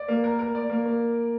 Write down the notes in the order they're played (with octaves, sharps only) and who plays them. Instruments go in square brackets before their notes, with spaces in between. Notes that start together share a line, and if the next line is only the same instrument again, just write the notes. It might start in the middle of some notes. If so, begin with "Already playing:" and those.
Already playing: [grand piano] D5
A#3
A#4
A#4
D5
A#3
A#3